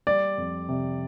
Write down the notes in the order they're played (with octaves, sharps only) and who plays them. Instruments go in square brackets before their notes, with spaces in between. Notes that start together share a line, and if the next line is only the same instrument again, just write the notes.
[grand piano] G3 [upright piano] D5
[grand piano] F2
C3